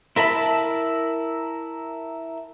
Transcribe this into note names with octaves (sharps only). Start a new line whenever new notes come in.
E4 A#4 E5 A5 B5